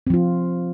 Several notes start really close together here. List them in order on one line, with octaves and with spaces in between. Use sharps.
C4 F3 F4